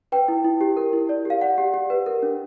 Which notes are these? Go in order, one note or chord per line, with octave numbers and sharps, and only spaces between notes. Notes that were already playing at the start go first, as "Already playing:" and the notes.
B4 G5
E4
E4
G4
A#4
E4
D5
G4 F5
D5 F#5
G4
G4
B4
A#4
D4